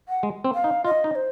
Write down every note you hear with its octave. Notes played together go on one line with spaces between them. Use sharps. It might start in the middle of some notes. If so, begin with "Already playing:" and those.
F#5
G#3
C4
F5
D#4
F4 D#5
D#4
C5